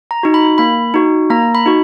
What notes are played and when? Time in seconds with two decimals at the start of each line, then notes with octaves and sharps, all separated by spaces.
0.11 A#5
0.23 D#4 F#4
0.34 B5
0.58 A#3 B5
0.94 D#4 F#4
1.30 A#3 A#5
1.55 B5
1.66 D#4 F#4